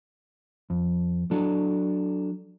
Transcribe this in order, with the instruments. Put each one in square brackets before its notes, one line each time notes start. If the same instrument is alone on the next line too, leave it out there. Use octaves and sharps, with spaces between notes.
[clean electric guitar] F2
F#3 D4 A4